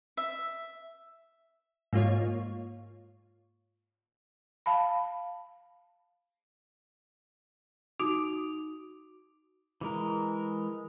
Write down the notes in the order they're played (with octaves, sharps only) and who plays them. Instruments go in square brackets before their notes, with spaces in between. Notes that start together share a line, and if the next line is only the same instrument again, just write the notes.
[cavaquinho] E5
[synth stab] G#2 A#3 F4 C#5
[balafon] F5 A5 B5
[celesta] D#4 F#4 D6 D#6 D7 F7
[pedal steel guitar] E3 G#3 A#4